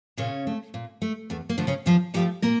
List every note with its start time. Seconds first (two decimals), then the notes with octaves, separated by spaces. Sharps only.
0.17 A#2 C#3 C#4
0.47 A3
0.74 A#2
1.02 A3
1.30 E2 A3
1.49 A#3
1.58 D3 F3 A3
1.67 C#3 C#4
1.86 E2 F3 F4
2.14 D3 F3 G3 A3 G4
2.42 A#2 A#3 A#4